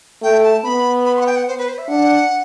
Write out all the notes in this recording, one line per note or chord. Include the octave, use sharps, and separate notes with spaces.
A3 G5
A5
B3 B5
B5
C6
F#5
G5
F#5
C5
B4
C5
E5
D4 F#5